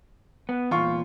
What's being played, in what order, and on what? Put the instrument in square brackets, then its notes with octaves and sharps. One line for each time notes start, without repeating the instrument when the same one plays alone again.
[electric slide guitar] B3
[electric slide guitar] E2 A#2 [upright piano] F4 C#6